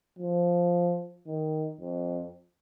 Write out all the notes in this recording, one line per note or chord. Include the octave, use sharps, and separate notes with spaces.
F3
D#3
F2